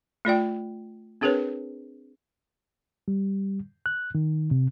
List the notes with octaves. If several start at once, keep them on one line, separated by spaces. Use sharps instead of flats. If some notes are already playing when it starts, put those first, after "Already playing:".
A3 F4 D5 G5
C4 D4 G#4 A#4 B4 C#5
G3
F#6
D#3
C3